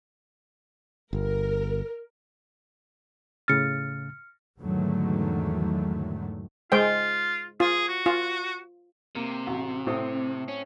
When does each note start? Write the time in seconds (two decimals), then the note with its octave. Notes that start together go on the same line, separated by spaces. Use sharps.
1.13 G1 A#4
3.48 A2 C#3 F6 A6 C#7
4.60 E2 G#2 D3 D#3 F#3 A3
6.72 G#3 F4 C5 G5
7.60 F4 G#4
7.88 F#4
8.06 F4
9.15 C3 A#3
9.47 A1 F#4
9.87 A2 C4 D#6
10.48 C#4